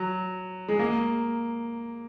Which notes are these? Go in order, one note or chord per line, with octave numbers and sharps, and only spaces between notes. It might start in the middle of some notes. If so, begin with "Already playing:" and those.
Already playing: F#3
G#3
A#3